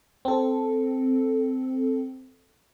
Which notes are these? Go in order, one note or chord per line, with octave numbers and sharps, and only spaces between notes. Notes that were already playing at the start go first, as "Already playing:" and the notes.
C4 A4